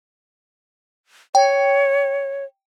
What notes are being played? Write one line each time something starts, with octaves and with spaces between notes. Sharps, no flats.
C#5 G5